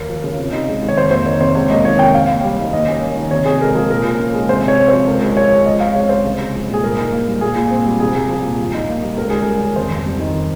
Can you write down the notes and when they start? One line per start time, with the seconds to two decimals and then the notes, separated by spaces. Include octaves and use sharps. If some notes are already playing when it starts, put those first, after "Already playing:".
Already playing: D#2 A#3 A#4
0.09 F3
0.24 C#3
0.38 C3
0.52 D#4
0.68 G#3
0.83 D#3
0.89 C#5
0.97 F2 C5
1.11 A#3 C5
1.26 D#3 C#5
1.41 C3 C5
1.55 C#2 C#5
1.70 A#3 D#5
1.85 D#3 C#5
1.99 C3 G5
2.14 D#2 F5
2.28 D#2
2.43 G3
2.59 D#3
2.73 D#2 D#5
2.87 C#4
3.02 A#3
3.17 D#3
3.31 C3 C#5
3.45 C3 G#4
3.61 G#3 A#4
3.75 F3 G#4
3.90 A#2 A#4
4.04 A#2
4.19 C#4
4.34 G#3
4.49 C3 C5
4.63 C3 C#5
4.78 C4
4.88 C5
4.93 F3
5.07 C#2 A#4
5.22 G#3
5.36 F3 C#5
5.52 C#3
5.66 C#2 D#5
5.80 C4 F5
5.95 G#3 C#5
6.09 C#3 C5
6.25 C2
6.40 G#3
6.54 F3
6.69 A#2 G#4
6.84 G2 A#4
6.97 D#4
7.12 A#3
7.27 G3
7.41 A#2 G#4
7.56 A#2
7.70 C4
7.85 G3
8.00 C2 G#4
8.15 C2
8.29 F3
8.45 A#2
8.59 G2
8.74 D#4
8.89 A#3
9.03 G3
9.17 C#2 A#4
9.30 C#2 G#4
9.43 G3 A#4
9.62 C#3
9.76 F2 C5
9.91 F2
10.05 G3
10.20 D#3